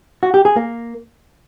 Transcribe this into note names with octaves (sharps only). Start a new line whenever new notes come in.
F#4
G4
G#4
A#3